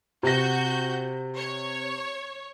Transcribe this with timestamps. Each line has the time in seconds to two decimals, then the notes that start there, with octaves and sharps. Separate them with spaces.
0.23 C3 F#4 G6 A#6
1.36 C#5